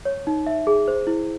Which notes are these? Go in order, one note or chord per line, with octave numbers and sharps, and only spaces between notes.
C#5
D#4
E5
G#4
C5
E4